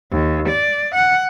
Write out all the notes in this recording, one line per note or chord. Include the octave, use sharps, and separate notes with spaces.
D#2
D5
F#5